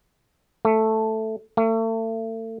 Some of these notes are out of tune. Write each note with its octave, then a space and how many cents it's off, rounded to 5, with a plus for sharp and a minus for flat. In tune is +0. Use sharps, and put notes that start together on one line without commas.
A3 +0
A3 +35